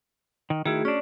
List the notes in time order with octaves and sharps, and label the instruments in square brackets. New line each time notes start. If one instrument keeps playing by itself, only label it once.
[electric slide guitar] D#3
[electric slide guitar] D#3 E4 [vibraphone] A3 F#4 G#4
[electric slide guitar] C#4 D4 [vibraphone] D5